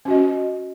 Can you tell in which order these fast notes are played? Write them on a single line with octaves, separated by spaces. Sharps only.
C#4 F#4 D#5